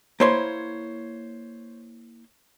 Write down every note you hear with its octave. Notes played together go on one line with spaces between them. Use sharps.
A#3 E4 C5 C#5 C6